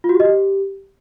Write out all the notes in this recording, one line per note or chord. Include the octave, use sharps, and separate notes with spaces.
F4
F#4
G4
D#5
G4